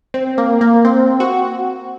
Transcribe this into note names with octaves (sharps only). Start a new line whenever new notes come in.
C4
A#3
A#3
C4
F#4